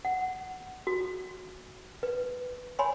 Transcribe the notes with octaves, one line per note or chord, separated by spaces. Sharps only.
F#5
F#4
B4
C#5 G#5 B5 C6